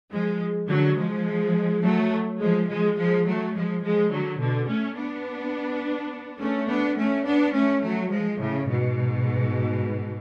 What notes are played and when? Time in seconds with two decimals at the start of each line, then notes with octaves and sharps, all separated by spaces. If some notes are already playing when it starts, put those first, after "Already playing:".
0.12 F3 G#3
0.69 D3 F#3
0.97 F3 G#3
1.83 F#3 A3
2.40 F3 G#3
2.68 F3 G#3
2.97 F3 G#3
3.26 F#3 A3
3.55 F3 G#3
3.83 F3 G#3
4.11 D3 F#3
4.39 B2 D3
4.68 A3 C#4
4.97 B3 D4
6.40 A3 C#4
6.68 B3 D4
6.97 A3 C#4
7.25 B3 D4
7.54 A3 C#4
7.82 F#3 A3
8.10 F3 G#3
8.40 A2 C#3
8.68 G#2 B2